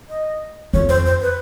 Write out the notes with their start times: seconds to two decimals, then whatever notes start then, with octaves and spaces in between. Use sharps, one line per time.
0.09 D#5
0.73 F2 C#5
0.89 C5
1.05 C5
1.22 B4